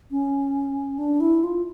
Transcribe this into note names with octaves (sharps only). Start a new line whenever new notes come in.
C#4
D4
E4
F4